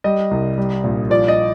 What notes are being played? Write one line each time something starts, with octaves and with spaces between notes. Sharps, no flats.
G3 D#5
C2
G3
A#1
F3 D5
D#5